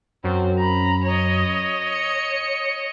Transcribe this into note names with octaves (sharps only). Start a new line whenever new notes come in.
F#2 C4
A#5 B5
C#5 D#5
C#7